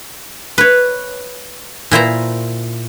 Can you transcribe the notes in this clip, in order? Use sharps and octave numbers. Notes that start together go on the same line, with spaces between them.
B4 C#5
A#2 E4 C5 A#5